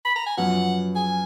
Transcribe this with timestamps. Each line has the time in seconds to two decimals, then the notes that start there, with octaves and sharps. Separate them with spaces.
0.05 B5
0.16 A#5
0.26 G#5
0.37 F#2 F3 B3 F#5
0.96 G#5